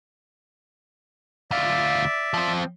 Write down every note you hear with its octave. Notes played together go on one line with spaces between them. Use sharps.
D2 F4 D5 E5
F3 C4